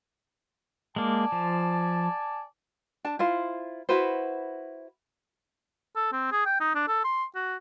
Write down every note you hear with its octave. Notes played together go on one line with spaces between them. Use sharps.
G#3 A#3 D5 G#5 A5
F3
D4 A5
E4 F4 C5
E4 F#4 B4 C5
A4
C4
G#4
G5
D#4
D4
A4
C6
F#4